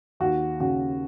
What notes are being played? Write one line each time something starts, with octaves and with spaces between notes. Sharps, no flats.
D#2 F#4
C#3 F#4